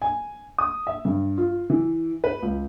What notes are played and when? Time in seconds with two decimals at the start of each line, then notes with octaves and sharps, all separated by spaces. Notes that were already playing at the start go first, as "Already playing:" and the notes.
0.02 G#5
0.58 D#6
0.87 E5
1.05 G2
1.38 F4
1.70 E3
2.24 B4
2.43 C#2